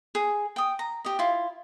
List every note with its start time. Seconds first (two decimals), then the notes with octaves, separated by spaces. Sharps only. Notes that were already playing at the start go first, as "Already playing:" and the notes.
0.15 G#4
0.56 G5 D#6
0.79 A#5
1.05 G4 D#5
1.19 E4 F4